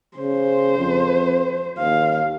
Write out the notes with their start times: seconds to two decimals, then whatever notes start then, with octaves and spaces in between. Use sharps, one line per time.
0.18 C#3 C5
0.78 F2
1.78 D#2 F5